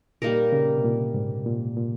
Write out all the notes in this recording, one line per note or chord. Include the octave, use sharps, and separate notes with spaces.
A#2 G3 A#3 D#4 A#4
C#3
C3
A#2
G#2
A#2
A#2